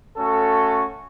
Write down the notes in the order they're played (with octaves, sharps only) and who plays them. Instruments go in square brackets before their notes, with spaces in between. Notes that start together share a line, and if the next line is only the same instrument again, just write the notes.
[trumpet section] A3 C#4 F#4 A4